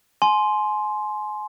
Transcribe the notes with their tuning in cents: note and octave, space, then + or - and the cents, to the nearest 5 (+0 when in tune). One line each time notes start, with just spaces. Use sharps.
G#5 +30 C6 +0